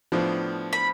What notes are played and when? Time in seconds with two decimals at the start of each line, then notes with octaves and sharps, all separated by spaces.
0.12 A2 F3 B3 D4
0.73 B5